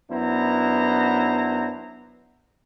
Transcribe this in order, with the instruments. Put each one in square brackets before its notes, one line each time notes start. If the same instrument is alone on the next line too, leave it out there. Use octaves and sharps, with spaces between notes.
[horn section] F#2 B3 D4 E4 C5 A#5